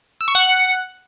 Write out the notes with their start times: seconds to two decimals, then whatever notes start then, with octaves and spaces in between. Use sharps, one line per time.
0.21 E6
0.28 C#6
0.35 F#5